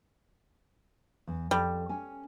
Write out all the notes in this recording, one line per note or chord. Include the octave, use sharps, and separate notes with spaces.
E2
F2 G3 A4
C#4 G#5